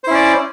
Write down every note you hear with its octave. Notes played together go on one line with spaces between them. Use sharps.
C#4 E4 C5 D5